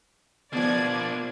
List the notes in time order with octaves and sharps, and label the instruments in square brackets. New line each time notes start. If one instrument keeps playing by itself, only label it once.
[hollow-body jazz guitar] B2 F3 [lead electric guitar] A#3 D4 [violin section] D5 G#6